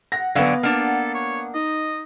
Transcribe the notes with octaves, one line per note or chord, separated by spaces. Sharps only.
F#5 A#6
D3 F#3 B3 D5 F5 G#5
A#3 D4 A4 F#5
C#5
D#4 D#5